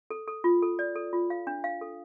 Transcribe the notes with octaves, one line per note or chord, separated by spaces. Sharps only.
A4
A4
F4
A4
D5
A4
F4
F5
D4
F5
A4